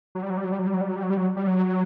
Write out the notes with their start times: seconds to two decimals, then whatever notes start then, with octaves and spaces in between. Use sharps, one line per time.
0.15 F#3
0.23 G3
0.30 F#3
0.37 G3
0.44 F#3
0.52 G3
0.59 F#3
0.67 G3
0.74 F#3
0.81 G3
0.89 F#3
0.96 G3
1.03 F#3
1.10 G3
1.17 F#3
1.36 G3
1.47 F#3